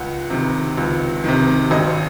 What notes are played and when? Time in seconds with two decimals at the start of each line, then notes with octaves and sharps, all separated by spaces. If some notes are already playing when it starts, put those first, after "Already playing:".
Already playing: C#2 F#5
0.30 C3 D#3
0.77 C#2
1.24 C3 D#3
1.71 G#1 D#5